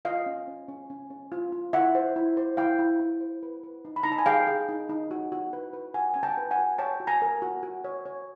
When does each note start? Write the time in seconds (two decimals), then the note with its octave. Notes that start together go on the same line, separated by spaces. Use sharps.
0.05 F4 D#5 F5
0.26 C#4
0.48 C#4
0.68 C#4
0.90 C#4
1.10 C#4
1.32 F4
1.52 F4
1.73 E4 E5 F#5
1.95 C5
2.16 E4
2.37 C5
2.57 E4 F5 G5
2.79 E4
3.00 E4
3.20 C5
3.43 B4
3.64 B4
3.85 D#4
3.96 B5
4.03 D#4 A#5
4.12 A5
4.18 G#5
4.26 G#4 F5 G5
4.47 G#4
4.69 D#4
4.89 D#4
5.11 F#4
5.32 F#4
5.53 B4
5.73 B4
5.94 F#4 F#5 G#5
6.14 C#4 G#5
6.23 G5 A5
6.37 B4
6.51 F#5 G#5
6.59 F#4
6.78 C#5 G5 A5
7.00 F#4
7.07 G#5 A#5
7.22 A#4
7.42 F#4
7.63 F#4
7.84 C#5
8.06 C#5